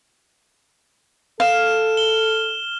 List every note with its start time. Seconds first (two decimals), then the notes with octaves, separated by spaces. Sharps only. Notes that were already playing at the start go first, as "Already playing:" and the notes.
1.40 A4 F5 F6 E7
1.97 G7